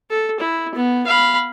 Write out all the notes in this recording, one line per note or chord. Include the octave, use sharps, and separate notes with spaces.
A4
E4
B3
F5 B5